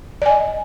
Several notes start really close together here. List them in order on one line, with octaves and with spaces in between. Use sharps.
D5 G#5 D#5